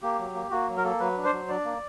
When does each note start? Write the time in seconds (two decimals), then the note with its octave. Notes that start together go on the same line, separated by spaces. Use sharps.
0.02 A#3 G4
0.19 F#3
0.35 A#3
0.51 A#3 F#4
0.68 F#3
0.77 A#4
0.84 A#3 A4
1.00 F#3 B4
1.17 D4
1.25 C5
1.33 F#3
1.49 D4 D5
1.65 A#3